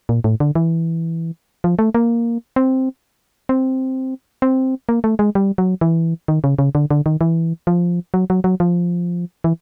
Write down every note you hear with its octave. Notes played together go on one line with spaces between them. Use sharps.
A#2
A2
D3
E3
F3
A3
A#3
C4
C4
C4
A#3
A3
G#3
G3
F#3
E3
D#3
C#3
C#3
D3
D3
D#3
E3
F3
F#3
F#3
F#3
F3
E3